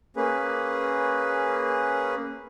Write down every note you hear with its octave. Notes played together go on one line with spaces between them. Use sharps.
A#3 C#4 G#4 B4